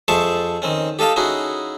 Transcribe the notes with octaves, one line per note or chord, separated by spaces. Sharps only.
F2 G#4 C5 E5 A5 C#6
D#3 C4 C#4
G4 A4 D#5 F5 A5
C#4 D#4 E4 F#4 G#4